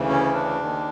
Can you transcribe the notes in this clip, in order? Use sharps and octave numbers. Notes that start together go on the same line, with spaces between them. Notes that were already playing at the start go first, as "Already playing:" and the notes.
Already playing: D2 C#3 E3
C#4
D4
D#2 D#3